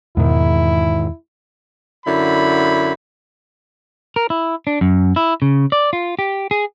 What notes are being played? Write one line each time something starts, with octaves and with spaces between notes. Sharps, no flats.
E2 G#2 B2 D#3 E3 E4
F#2 D3 E4 B5
A#4
E4
D4
F#2
E4
C#3
D5
F4
G4
G#4